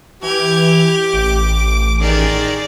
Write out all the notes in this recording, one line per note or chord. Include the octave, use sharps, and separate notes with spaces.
E3 G4 G#6 F7
A1 D6
D#3 G#4 D5